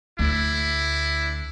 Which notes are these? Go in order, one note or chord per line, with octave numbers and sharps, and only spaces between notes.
D2 D4 E4